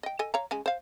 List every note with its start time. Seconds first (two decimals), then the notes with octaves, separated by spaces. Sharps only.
0.03 D#5 G5
0.19 A4 D#5 G#5
0.34 C#5 F5 A#5
0.51 C#3 G#3 G#5
0.66 C5 F5